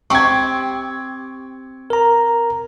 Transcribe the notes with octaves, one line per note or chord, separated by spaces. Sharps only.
C4 G4 C#6 G#6
A#4 A#5